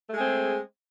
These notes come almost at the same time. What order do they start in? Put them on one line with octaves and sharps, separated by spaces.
A3 G#3 G#4 C4